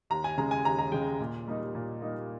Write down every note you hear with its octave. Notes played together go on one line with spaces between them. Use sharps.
D#2 A#5
G#5
C#3 G#3 A#5
G#5
D#2 A#5
A#5
C#3 G#3 G5
A#2
G3 A#3 D#4
A#2
G3 A#3 D#4